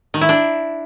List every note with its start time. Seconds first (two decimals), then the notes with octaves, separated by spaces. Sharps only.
0.14 D#3
0.21 E4
0.29 D4